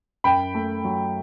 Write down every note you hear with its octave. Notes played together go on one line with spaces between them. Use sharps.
F#2 G5 B5
A3
F#3